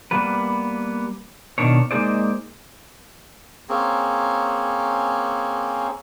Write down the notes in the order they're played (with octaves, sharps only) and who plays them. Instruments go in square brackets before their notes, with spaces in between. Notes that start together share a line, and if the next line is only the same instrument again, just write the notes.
[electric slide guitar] G3 A#3 B3 B4
B2 D#3 D4 C#5
G#3 A#3 D#4 G#4 C5 D5
[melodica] A#3 C4 C#4 G#4